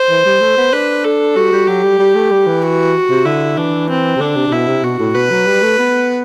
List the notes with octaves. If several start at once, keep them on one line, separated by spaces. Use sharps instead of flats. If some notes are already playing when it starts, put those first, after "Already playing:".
Already playing: C5
E3
G3
A3
B3
D4 B4
A4
G3 F#4
G3
F#3 G4
G3
G3
A3
G3
E3
F#4
C3
D3 E4
E3 D4
C4
C3
D3 D4
C3
C3
B2 E4
C3
B2 F#4
A2
B2 B4
F#3
G3
A3
B3